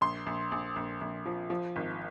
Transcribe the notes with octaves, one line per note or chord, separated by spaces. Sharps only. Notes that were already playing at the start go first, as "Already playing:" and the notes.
A#1 C6
A#1
A#1
A#1
A#1
F3
F3
G#1